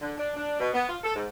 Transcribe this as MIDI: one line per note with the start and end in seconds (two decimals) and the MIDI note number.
0.01 0.13 50
0.17 0.31 62
0.35 0.56 62
0.59 0.69 47
0.74 0.85 59
0.88 0.97 65
1.03 1.12 69
1.15 1.26 44